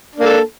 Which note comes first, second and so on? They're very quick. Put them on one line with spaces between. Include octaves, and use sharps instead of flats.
D4 A#3 A4